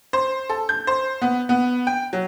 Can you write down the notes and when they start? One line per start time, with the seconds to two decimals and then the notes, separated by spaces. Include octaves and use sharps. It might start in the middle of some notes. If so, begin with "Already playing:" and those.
0.13 C5
0.50 A4
0.69 G6
0.87 C5
1.22 B3
1.49 B3
1.87 G5
2.13 F#3